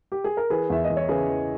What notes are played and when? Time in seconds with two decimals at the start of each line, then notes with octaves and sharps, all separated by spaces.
0.12 G4
0.24 G#4
0.37 A#4
0.50 E3 G#4 B4
0.70 E2 E5
0.84 D#5
0.90 E2
0.97 C#5
1.09 C#3 G#4 B4
1.29 E3